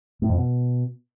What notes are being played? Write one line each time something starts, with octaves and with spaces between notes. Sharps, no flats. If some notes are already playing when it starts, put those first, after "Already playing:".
A2
F2
B2